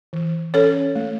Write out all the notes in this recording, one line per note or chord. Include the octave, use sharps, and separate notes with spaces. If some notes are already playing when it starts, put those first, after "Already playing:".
E3
C#4 A4 C#5
A3